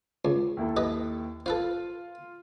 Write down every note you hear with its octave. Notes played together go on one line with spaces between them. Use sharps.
C#2
D#2 E4 A4
G4 B4 D#5
F4 A4 B4 C5